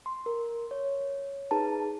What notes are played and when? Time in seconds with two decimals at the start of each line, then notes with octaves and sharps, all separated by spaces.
0.06 C6
0.26 A#4
0.71 C#5
1.51 D#4 G#4 B4 A5 A#5